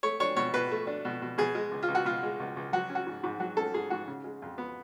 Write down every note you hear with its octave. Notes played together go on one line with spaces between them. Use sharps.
A3 C#5
D4 C#5
B2 C#5
B2 B4
A3
D4
B2
B2
B2 G#4
G#3
C#2
F4
C#2
F#4
B2 F4
G#3
C#2
C#2
F#3 F#4
C#4
F#4
G#2
G#2
F#3 F#4
C#4 A4
G#2 G#4
G#2 F#4
C#3
G#3
F2
B3